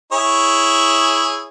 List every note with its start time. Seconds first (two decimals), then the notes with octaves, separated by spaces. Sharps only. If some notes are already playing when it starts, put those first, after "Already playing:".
0.12 E4 G#4 C#5